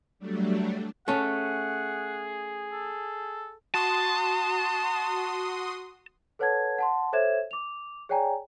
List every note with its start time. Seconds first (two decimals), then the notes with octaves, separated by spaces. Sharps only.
0.19 F#3 G3 A3 D4
1.08 A3 C#4 G#4 F#5
2.71 A4
3.74 F#4 A5 C6 D#6
6.39 A4 B4 C#5 F#5 A5 G#6
6.78 F#5 A5 C6
7.13 A4 C5 C#5 E5 G#6 E7
7.51 D6 F7
8.09 G#4 C#5 D5 G5 G#5 A#5